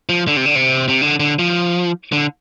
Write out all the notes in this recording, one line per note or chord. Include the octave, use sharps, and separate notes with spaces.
F3
D3
C3
D3
C3
C3
D3
D3
F3
D3